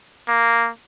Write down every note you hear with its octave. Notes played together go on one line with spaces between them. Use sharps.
A#3